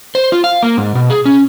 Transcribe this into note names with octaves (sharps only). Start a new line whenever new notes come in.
C5
F4
F5
A#3
G#2
B2
G#4
C#4